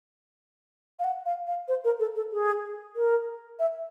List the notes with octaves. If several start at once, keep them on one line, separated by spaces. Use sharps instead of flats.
F5
F#5
F5
F5
C5
A#4
A4
A4
G#4
A#4
E5